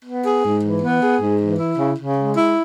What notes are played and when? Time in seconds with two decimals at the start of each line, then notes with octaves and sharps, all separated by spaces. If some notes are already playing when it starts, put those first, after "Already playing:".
0.05 B3
0.25 G#4
0.44 G#2
0.63 E3
0.82 B3
1.02 G#4
1.21 G#2
1.40 E3
1.59 E4
1.78 C#3
1.97 C#3
2.17 G#3
2.36 E4